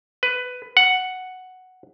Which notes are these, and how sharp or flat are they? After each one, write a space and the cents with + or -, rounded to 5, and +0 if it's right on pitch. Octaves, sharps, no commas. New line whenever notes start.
B4 +10
F#5 +0